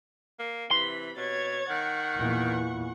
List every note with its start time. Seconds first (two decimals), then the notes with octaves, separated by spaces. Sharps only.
0.39 A#3
0.71 C3 E3 B5 C6
1.17 B2 C#5 G#6 A6
1.70 D#3 F#5 C#6
2.17 E2 A#2 E3